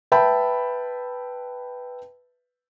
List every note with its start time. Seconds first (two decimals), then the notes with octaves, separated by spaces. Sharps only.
0.12 B4 E5 G5 A5 B5